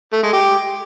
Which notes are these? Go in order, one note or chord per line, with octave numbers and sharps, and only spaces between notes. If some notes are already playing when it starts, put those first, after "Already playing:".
A3
G#3
G4